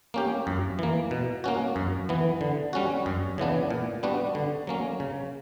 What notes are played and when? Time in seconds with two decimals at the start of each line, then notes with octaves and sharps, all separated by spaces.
0.14 A#3 C#4 G4
0.47 F#2
0.79 E3 A#3
1.11 B2
1.44 A#3 C#4 F#4
1.76 F#2
2.09 E3 B3
2.41 D3
2.73 G3 C#4 F#4
3.06 F#2
3.38 C#3 E3 B3 D4
3.70 A#2
4.03 G3 B3 D4 F#4
4.35 D3
4.67 F#3 A#3 C#4
5.00 C#3